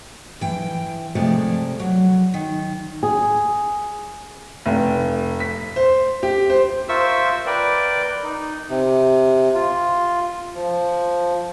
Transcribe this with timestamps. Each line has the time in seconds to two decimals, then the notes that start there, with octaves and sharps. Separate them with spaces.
0.41 E3 G5
1.15 C3 F3 G#3 A3 D5
1.80 F#3
2.34 D#3
3.03 G#4
4.66 F1
5.40 B6
5.76 C5
6.23 G4
6.50 C5
6.89 F4 A#4 C5 E5 C#6 E6
7.46 A#4 B4 D5 G5
8.23 D#4
8.68 C3
9.55 F4
10.56 F3